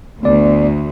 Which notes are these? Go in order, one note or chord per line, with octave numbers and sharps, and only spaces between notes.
D2 B3 D5